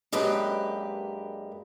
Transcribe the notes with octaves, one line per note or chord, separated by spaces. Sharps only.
F#2 G#3 A#3 D4 G4 B4